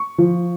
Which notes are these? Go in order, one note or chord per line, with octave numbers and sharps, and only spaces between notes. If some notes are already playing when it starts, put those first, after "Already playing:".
Already playing: C#6
F3